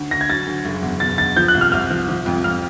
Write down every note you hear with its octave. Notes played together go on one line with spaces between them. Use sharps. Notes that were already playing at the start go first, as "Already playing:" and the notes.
Already playing: D2
D2 A#6
G#6
F#3 A6
D2
F#1
E2
B2 A6
B2 A6
F3 G6
F#6
C2
F6
C2 F6
F3
F3
F2
F2 F6